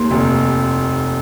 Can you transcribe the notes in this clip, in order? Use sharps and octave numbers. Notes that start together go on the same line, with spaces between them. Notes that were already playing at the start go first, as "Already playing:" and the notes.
Already playing: D#2 A#3 C6
F1